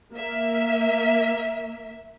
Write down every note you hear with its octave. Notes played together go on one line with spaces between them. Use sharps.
A#3 E5